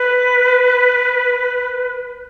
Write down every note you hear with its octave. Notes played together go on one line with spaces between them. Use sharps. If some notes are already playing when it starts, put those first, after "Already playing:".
Already playing: B4